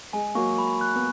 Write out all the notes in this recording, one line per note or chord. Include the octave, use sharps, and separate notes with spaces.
G#3 G#5
F#3 A#3 C#6
B5
F#6
B3